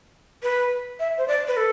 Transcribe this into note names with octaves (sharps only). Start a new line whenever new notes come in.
B4
E5
C5
D5
B4
A4